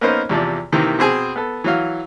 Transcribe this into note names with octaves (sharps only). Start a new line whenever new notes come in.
A#3 B3 C#4 D#4 A#4 C5
E2 C3 F3 D5
C3 D#3 E3 A#3 C4
B2 C4 G#4 G#5
B3 A4
E3 F#3 F5